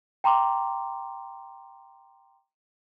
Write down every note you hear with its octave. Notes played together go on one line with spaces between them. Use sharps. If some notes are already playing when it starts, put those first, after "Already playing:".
G5 A#5 C6 D6